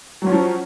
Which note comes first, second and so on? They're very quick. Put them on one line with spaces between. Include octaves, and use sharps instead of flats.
F#3 C#4 F3